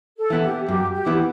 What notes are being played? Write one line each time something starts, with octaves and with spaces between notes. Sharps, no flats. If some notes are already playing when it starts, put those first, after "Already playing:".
A4
E3 B3 E4
G4
F#2 G4
G4
E3 B3 E4